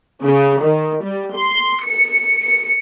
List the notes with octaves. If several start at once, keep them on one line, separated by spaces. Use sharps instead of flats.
C#3
D#3
G3
C6
C#7
C#7